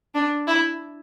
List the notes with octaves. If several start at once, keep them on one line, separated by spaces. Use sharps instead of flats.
D4
E4